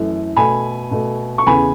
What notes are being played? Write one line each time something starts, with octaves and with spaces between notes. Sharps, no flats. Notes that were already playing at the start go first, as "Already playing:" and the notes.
Already playing: F#2 E3 A3
B2 A3 G#5 B5
B2 A3
C#6
E2 C#3 E3 G#5 B5